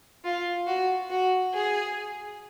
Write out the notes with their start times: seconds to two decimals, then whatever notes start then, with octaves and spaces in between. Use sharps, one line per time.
0.25 F4
0.67 F#4
1.10 F#4
1.54 G#4